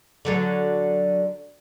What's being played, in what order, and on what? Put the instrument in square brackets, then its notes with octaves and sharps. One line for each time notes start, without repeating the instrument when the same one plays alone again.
[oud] D3 F#3 A4